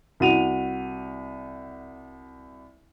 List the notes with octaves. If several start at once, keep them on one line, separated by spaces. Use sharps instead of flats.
C2 F#4 D#7 F7